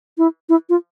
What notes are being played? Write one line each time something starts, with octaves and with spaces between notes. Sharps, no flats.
E4
E4
F4